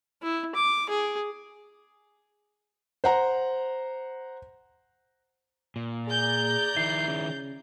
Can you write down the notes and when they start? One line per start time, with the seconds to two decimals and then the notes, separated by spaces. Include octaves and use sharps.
0.23 E4
0.55 D6
0.89 G#4
3.04 C5 F#5 A#5
5.76 A#2
6.07 G#4 D5 A#5 G6
6.77 D#3 E4 C7
7.08 C#3